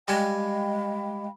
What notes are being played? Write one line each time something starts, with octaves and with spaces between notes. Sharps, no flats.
G3 G#3 F5 G5 G#5 B5